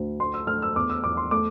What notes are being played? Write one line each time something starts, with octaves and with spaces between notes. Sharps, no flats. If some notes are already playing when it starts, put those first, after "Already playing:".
Already playing: D2
A3 C6
E6
A3 F6
E6
E2 D6
E6
E2 D6
C6
A3 D6